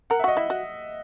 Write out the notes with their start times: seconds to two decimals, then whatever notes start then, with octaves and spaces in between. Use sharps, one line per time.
0.10 A#4 F#5
0.19 E5
0.24 F#4 D#5
0.36 E4 E5
0.50 F#4